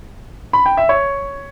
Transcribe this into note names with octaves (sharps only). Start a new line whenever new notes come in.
B5
G5
E5
C#5